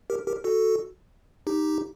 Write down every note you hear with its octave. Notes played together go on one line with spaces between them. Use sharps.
G4 A#4
G4 A#4
F#4 A4
D#4 G4